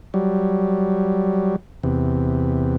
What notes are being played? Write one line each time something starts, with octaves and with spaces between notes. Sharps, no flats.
F#3 G3
E2 C3